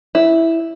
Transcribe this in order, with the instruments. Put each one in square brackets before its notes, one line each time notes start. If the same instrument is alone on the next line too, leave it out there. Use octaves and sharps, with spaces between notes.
[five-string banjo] E4